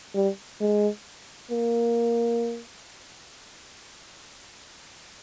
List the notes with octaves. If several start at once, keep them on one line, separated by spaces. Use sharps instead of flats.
G3
G#3
A#3